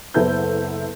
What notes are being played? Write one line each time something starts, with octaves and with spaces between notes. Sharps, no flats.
F#1 B3 E4 A4 B4 G6